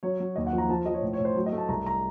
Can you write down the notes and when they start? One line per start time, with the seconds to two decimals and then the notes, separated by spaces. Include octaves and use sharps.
0.03 F#3 C#5
0.20 F#3
0.36 D#2 D#5
0.47 F#5
0.53 F3
0.58 A#5
0.69 F3 A5
0.86 F3 D#5
0.94 C#5
1.02 A2
1.13 C#5
1.20 A2
1.25 C5
1.36 F#3
1.46 D#5
1.52 A3
1.58 A5
1.68 C2 A#5
1.86 A#5